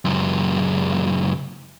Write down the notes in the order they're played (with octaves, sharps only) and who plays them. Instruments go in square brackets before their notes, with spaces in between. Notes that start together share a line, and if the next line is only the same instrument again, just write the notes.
[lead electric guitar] C#2 F#2